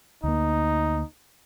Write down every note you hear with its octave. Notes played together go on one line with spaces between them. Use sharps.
D2 A#3 D#4